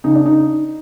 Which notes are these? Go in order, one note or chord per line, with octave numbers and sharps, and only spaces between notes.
C#3 D#4
D4
D#4